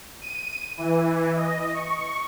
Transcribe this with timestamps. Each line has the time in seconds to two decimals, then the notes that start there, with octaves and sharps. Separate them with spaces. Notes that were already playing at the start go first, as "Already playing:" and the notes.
0.22 D#7
0.78 E3
1.36 D#5
1.74 C#6